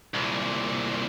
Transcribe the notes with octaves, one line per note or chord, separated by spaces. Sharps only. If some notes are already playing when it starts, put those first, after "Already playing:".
C2 A#2